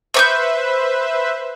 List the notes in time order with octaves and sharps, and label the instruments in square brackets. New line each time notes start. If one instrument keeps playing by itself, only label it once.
[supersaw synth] B4 C5 E5 [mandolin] C#6 D6 G6